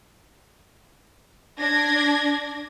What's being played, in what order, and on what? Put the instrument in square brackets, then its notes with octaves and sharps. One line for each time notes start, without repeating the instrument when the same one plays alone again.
[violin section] D4 G#6 A#6